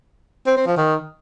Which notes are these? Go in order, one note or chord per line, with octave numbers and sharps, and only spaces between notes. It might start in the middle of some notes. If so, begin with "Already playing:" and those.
C4
C4
F3
D#3